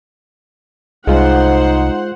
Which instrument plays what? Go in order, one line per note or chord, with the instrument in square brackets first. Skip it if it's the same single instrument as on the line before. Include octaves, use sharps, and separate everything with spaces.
[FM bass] C2 [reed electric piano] G#3 F4 [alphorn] D#4 [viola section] C5 F#5